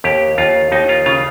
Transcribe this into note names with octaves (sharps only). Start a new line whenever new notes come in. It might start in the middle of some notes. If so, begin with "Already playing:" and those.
D#2 G4
D#2 F4
D#2 D#4
F4
C#3 F4